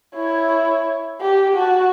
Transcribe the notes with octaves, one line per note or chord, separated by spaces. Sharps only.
E4 C#5
G4
F#4 A5